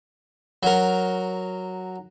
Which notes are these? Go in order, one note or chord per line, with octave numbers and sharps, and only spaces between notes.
F#3 A#4